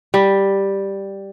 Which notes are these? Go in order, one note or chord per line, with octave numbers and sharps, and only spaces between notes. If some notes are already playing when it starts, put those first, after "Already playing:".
G3